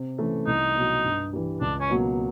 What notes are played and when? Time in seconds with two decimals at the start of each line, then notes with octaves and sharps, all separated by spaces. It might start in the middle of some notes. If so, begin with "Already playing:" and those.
Already playing: C3
0.18 E3 A3 C#4
0.47 C2 D#4
0.75 B2 F#3
1.05 G2
1.33 E3 G3
1.61 C#2 D4
1.80 C#4
1.90 B2 F#3 A#3